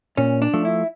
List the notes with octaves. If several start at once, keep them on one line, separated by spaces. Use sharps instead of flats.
A#2 C#4
D4
F3 A3
E4